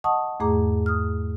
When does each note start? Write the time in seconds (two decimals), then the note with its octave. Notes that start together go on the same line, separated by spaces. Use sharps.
0.04 D#5 F#5 A5 C#6 D#6
0.40 E2 G#2 A3 G#4 A#5 D6
0.86 D#6 F6